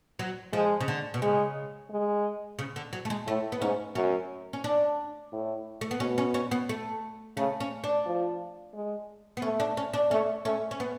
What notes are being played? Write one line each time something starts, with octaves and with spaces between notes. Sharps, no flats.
F#3
F3 G#3
C#3
D3
B2
C#3 G#3
G#3
C#3
D3
F#3
A3
G#3
A2 A3
B3
G#2 C#4
F#2 C#4
C#4
D4
A2
A3
B3
B2 C#4
C#4
C#4
B3
A3
C#3 A3
C#4
D4
F3
G#3
B3
A3 C#4
D4
C#4
D4
A3 C#4
A3 C#4
C#4
B3